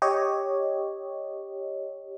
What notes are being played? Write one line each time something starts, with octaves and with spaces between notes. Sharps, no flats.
G4 C#5 D#5